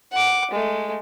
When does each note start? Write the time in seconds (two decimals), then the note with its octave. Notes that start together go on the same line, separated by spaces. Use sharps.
0.12 F#5 D6
0.51 G#3 A3